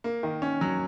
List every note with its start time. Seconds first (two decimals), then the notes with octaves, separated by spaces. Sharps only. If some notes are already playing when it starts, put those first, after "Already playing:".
0.04 A#3
0.23 D#3
0.42 C#4
0.61 F#3